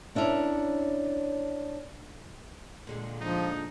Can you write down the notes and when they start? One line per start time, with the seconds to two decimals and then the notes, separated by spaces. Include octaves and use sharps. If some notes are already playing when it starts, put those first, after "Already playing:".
0.15 C#4 D4 E4 F#4 A#4 C#5
2.87 A#2 D3 G#3
3.21 F3 D4 D#4